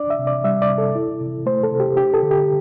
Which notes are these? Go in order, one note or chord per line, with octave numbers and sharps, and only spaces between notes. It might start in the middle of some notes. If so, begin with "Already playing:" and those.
Already playing: D4 D5
E5
C3
D5
G3 E5
D5
C3
A4
E4
C3
A3 C5
A4
C3
G4
D4 G4
A4
D3
G4